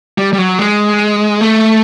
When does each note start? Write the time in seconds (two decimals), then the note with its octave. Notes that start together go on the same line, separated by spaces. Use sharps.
0.18 G3
0.33 G3
0.38 F#3
0.59 G#3
1.41 A3